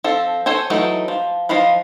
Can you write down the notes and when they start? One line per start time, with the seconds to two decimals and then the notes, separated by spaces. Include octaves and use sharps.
0.04 F3 C4 A4
0.46 A4 C5 C#5 G#5
0.70 E3 F#3 A3 D#4
1.08 F3
1.49 F3 D#5 F5 B5